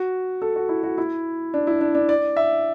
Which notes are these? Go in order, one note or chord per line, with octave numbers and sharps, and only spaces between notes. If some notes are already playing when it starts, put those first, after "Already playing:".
Already playing: F#4
A4
F#4
E4
F#4
E4
D4
E4
D4
D4
D5
E5